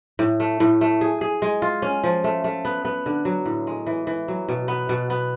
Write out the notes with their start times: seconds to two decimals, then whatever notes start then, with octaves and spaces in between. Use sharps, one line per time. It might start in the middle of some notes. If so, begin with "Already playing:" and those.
0.19 A2
0.40 A3
0.60 A2
0.81 A3
1.01 G#4
1.21 G#4
1.42 G#3
1.62 F4
1.82 C#4
2.04 F3
2.24 A3
2.44 A3
2.65 B3
2.85 B3
3.06 D3
3.25 F#3
3.46 A2
3.67 G#3
3.87 E3
4.07 E3
4.28 F#3
4.49 B2
4.68 B3
4.89 B2
5.10 B3